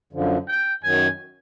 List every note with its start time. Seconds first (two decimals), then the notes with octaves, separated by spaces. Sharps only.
0.13 F#2 D3 F3
0.48 G5
0.83 F#2 D#3 F#3 G#5